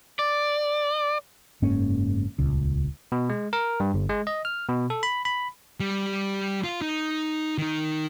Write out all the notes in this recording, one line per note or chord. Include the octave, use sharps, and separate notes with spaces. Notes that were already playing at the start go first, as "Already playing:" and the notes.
D5
F#1 G#2 A#3 C#4
D#1 C#2
B2
G#3
A#4
G2
G1
G#3
D#5
F6
B2
A4
B5
B5
G3
F4
D#4
D#3 D#4